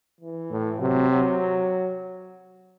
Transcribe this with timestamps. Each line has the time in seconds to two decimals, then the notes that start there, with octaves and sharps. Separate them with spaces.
0.21 E3
0.50 A2
0.80 C3 F#3
1.10 F#3